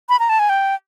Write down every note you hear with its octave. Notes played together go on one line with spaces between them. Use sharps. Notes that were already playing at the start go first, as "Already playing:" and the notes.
B5
A#5
A5
G#5
G5